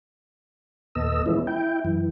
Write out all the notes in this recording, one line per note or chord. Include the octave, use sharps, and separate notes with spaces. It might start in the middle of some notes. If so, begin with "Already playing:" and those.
D#2 A#2 B3 A4 D#5 E6
E3 F3 G#3 B3 C#4 E4
E4 G5
F#2 E3